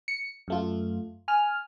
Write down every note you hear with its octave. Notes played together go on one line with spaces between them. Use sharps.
C#7
F#2 A3 F4
G#5 F6